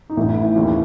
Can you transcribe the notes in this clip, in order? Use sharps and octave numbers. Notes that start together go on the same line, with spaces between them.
D#4
A1 A2 E3 E4
D#2 C#3 E3